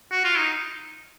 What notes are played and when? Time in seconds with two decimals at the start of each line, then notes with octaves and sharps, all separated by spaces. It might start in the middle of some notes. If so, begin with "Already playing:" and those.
0.11 F#4
0.24 F4
0.38 D#4